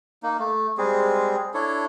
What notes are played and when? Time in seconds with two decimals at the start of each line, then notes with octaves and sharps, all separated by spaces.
0.23 A#3 D#4
0.39 A3
0.78 G3 G#3 C4 G#4
1.54 D4 E4 A4 C#5